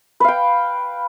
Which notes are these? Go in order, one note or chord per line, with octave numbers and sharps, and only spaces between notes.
B4 F5 G5